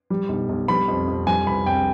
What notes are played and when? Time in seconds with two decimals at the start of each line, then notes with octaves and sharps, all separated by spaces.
0.10 G3
0.29 B1
0.49 B1
0.68 G3 B5
0.88 F2
1.08 F2
1.27 G3 G#5
1.47 C2 B5
1.66 C2 G5